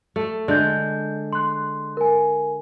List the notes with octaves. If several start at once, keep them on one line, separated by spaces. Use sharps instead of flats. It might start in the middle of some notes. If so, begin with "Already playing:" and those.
A3
D3 G#3 D#5 G6
C6 F#6
A#4 G#5